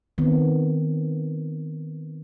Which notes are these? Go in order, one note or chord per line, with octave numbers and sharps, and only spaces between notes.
D#3 B3 C4